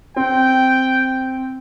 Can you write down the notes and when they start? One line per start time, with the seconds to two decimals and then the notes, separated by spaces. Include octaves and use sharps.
0.16 C4 G5